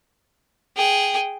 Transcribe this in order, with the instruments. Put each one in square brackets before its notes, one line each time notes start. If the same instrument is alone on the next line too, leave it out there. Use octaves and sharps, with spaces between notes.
[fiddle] G#4 G5